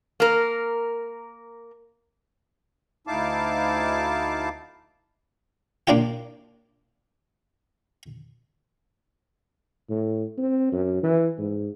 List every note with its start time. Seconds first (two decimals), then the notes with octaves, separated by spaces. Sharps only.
0.20 A#3 A#4
3.07 D2 D#4 E4 F5 A5 D6
5.87 A#3 D4 F4 G4
9.89 A2
10.38 C4
10.72 F#2
11.03 E3
11.38 G#2